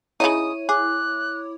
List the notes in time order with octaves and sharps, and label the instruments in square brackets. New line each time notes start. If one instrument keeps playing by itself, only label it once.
[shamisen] C#3 E3 D#4 [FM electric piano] E4 C#5 [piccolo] D#6 [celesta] D#7
[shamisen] G#4 [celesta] D6 [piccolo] F#6